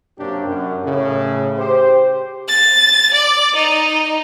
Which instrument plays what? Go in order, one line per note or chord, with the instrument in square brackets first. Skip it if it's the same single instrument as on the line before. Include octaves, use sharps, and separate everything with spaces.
[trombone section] F#2 C3 A#3 C#4 D4 G4
F#2
A2 C#3
G4 C5
[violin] A6
D5
D#4